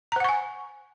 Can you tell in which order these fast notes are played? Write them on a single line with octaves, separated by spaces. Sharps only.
A#5 C5 F#5 C#6 G#5